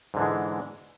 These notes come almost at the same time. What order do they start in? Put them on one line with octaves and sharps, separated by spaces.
G#2 D3 E3 G#3